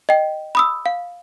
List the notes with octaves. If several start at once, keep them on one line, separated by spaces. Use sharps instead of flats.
D#5 G5
B5 D#6 E6
F5